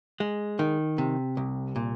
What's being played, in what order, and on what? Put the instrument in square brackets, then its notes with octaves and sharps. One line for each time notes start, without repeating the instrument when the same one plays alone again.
[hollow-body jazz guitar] G#3
D#3
C3
C2
A#2